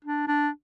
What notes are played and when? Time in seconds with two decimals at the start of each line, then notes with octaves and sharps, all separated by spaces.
0.05 D4
0.28 D4